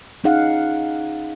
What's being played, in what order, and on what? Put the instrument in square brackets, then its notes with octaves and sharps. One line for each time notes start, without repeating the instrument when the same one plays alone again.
[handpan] C#4 D#4 G#4 F5 F#5